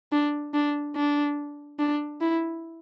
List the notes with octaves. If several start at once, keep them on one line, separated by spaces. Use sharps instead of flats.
D4
D4
D4
D4
E4